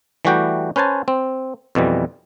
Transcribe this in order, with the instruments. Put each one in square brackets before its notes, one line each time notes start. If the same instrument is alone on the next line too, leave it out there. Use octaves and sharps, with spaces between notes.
[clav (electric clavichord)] E3 G3 A3 F#4 G4 G5
C#4 B4 C5 G#5 A5
C4
F2 B2 E3 G3